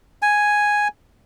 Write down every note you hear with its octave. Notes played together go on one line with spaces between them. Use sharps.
G#5